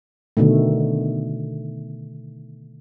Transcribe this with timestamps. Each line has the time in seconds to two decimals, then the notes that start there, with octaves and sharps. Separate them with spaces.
0.37 B2 D3 D#3 A3